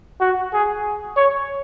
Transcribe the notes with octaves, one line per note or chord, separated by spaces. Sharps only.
F#4
G#4
C#5